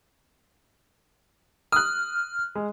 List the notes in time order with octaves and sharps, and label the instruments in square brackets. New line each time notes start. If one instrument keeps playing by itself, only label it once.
[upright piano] D#6 F#6 [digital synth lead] F6
[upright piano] G#3